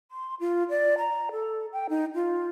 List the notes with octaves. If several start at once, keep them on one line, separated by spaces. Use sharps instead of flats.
C6
F4
D5
A#5
A4
G5
D#4
F4